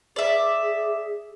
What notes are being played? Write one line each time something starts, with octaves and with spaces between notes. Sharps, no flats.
G#4 D5 E5